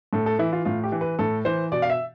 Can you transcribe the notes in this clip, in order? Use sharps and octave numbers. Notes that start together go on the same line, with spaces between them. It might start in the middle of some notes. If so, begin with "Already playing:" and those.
A2 A4
A4
E3 E4
F4
A2 F4
G4
E3
B4
A2 A4
E3 C5
B2 D5
F5
E5